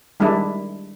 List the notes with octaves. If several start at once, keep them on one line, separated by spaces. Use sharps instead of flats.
D#3 G3 G#3 D4 E4